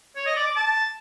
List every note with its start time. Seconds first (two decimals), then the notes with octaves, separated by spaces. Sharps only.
0.16 C#5
0.26 D#5
0.36 D5
0.46 D6
0.56 A5